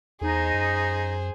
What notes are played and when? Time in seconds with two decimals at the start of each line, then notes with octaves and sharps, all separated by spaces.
0.21 E2 D#4 G#4 C5
0.54 F#2